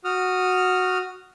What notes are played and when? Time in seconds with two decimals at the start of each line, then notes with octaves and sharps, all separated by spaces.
0.04 F#4 D#6 F6